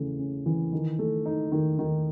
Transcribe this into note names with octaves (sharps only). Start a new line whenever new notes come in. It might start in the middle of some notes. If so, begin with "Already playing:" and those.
Already playing: C#3 E3 A3
C#4
E3
D#3
A3
D#4
D#3
D#3